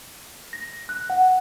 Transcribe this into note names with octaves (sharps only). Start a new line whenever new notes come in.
A#6
F#6
F#5